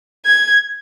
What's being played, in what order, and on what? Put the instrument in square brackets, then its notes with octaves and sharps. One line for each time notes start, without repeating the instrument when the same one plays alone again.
[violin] G#6